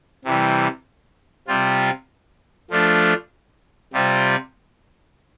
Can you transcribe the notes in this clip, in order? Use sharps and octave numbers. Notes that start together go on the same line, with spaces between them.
C3 E3 G3
C3 G3 C4 F4
F3 A3 D4 F4
C3 G3 C4 F4